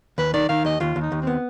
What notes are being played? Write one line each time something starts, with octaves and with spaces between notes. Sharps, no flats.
D#2 B4
D#3 D5
D#3 F5
D#2 D#5
D#2 F4
D#2
D#4
D#2
C4
B3